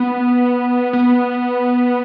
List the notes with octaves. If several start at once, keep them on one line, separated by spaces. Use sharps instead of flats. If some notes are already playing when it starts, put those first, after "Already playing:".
Already playing: B3
B3